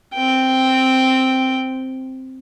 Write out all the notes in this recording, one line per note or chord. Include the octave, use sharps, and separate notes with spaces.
C4 G5